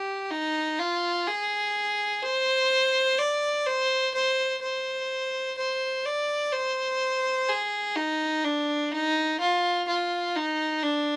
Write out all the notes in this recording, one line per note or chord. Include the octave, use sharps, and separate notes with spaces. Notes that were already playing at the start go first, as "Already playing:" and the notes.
Already playing: G4
D#4
F4
G#4
C5
D5
C5
C5
C5
C5
D5
C5
G#4
D#4
D4
D#4
F4
F4
D#4
D4